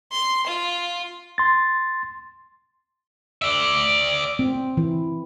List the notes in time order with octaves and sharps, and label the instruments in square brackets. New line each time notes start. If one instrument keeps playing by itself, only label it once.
[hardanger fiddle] C6
F4
[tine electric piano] C6 A6
[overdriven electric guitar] D5 E5
[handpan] C4
E3